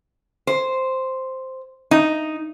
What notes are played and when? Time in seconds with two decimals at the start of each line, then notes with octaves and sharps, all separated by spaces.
0.47 C5
1.91 D#4